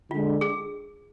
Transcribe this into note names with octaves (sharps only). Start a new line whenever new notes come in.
D3 G#3 D4 F4
G#4